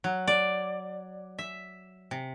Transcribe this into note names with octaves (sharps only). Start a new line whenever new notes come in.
F#3
D5
E5
C3